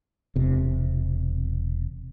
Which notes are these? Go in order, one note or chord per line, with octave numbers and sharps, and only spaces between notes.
E1 C3